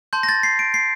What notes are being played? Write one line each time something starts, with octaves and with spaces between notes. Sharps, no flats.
A5 C6 G6
A#6
A6
C7
D7
C7